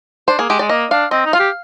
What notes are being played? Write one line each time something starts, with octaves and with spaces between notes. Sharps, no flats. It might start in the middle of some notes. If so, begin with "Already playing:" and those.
D4 C5
A#3 G#4
G#3 G4
G#3 D5
A#3 D#5
D4 F5
C4 D#5
D#4
F4 F5
G4